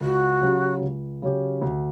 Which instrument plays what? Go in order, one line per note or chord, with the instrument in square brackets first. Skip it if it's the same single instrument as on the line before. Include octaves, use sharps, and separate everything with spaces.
[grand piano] C#2 [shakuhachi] F#4
[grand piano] C#3 F#3 C#4 G4
C#2
C#3 F#3 C#4 G4
D2